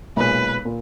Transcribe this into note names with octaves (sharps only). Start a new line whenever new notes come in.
B1 A#2 G#3 B4
A#2